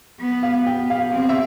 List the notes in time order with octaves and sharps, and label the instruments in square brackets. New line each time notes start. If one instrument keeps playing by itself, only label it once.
[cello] B3
[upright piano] F5
[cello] B3 [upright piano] G5
[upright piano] F5
[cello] C4 [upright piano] F5
[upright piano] E5